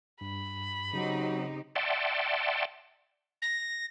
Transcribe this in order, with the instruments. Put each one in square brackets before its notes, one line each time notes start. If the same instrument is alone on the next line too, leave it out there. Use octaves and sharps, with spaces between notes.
[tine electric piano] G2 [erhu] B5
[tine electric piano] C#3 [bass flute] F#3 [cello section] C4 D#4 G4
[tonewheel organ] D5 E5 F#5 G5 A5 C6
[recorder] A#6